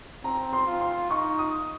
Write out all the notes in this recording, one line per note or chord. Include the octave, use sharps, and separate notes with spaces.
C4 A#5
C6
F4
C6
D#4 C#6
D#6